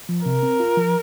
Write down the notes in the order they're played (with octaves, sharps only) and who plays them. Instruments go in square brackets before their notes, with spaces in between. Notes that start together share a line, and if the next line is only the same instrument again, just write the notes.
[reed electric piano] F3
[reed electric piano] C3 [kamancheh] A#4
[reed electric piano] C4
F4
F3